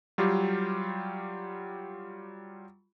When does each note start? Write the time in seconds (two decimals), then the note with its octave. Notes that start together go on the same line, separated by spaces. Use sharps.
0.18 F#3 G3 F4 G4